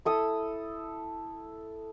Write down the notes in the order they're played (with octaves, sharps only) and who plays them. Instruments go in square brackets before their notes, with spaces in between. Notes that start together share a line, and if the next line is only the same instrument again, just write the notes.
[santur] E4 A4 D#6